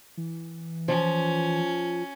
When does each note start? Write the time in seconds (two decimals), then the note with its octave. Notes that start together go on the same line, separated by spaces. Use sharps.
0.17 E3
0.88 F3 C#4